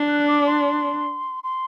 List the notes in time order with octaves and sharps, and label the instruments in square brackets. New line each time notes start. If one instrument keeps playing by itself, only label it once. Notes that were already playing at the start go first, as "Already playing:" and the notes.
Already playing: [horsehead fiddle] D4
[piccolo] F#6
D6
C6
C6